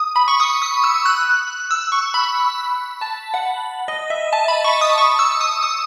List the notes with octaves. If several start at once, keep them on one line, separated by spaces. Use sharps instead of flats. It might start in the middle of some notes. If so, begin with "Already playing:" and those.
Already playing: D#6
B5
C#6
D#6
D#6
E6
F#6
E6
C#6
B5
A5
F#5
D#5
E5
A5
B5
C#6
D#6
C#6
E6
D#6
D#6